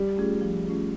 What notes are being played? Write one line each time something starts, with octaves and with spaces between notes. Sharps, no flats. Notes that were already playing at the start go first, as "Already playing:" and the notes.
Already playing: G3
A3 C#4 F4 G#4
F3
A3 C#4 F4 G#4